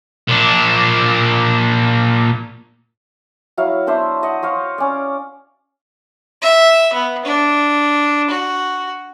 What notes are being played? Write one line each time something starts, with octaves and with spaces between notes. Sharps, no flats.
A#2 D4
F#3 E4 F5
B3 D4 C5 E5
D#5 F#5
C5 C#5 F5
C#4 D5
E5
B3
D4
F#4